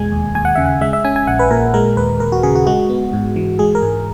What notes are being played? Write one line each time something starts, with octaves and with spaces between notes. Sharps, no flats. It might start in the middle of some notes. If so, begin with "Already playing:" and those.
Already playing: E2 B2 G#3 G#5
D#2
D#2 G#5
F#5
C#3 E5
F#5
G#3 E5
E5
C#4 G#5
G#5
A#1 F#5
B4
A#2 A#4
G#3 A#4
D#2 B4
D#2 A#4
F#4
C#3 G#4
F#4
G#3 F#4
B3
G#2
E3
G#3 G#4
A#4
G#2